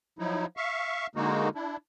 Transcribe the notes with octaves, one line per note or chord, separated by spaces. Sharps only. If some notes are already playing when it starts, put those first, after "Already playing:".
F3 F#3 D#4 E4
E5 F5 C#6
D3 G#3 A#3 D#4 F#4
D4 E4